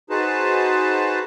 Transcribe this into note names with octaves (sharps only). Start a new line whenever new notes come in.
D#4 F#4 G#4 B4 C5 A5